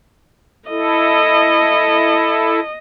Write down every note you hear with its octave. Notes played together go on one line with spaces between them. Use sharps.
E4 A4 D#5